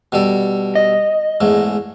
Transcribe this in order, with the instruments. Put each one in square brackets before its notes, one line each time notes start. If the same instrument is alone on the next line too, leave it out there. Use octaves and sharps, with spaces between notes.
[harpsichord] B2 G3 A4
[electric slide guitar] D#5
[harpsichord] E2 G#2 A3